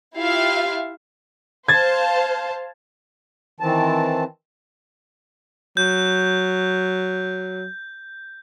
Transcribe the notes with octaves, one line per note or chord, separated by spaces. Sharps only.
E4 F4 G4 E5 F5
C5 F5 A5 G#6 A6
D#3 E3 C4 A5
F#3 G6